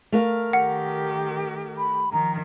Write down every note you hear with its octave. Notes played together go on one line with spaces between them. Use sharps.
A3 A#4 F5
D#3 G4 F#5
B5
D#3 F3 A#5